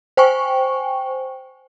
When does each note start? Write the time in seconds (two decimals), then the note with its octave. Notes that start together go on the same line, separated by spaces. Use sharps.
0.17 C5 G5 G#5 C#6